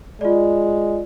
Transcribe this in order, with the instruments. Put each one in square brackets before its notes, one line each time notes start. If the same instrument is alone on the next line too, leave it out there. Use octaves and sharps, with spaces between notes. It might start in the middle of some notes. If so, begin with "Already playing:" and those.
[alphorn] G#3 [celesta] F4 D5